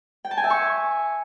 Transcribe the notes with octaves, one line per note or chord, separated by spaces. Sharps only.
G5
A5
G#5
E5
C#6